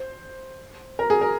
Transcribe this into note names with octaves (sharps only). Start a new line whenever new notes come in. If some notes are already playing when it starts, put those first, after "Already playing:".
Already playing: C5
A#4
G#4
A#4